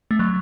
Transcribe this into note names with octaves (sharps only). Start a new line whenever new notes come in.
A3
F#3